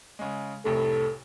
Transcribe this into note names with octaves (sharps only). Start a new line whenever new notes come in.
C#3 G#3
F1 C2 A2 A4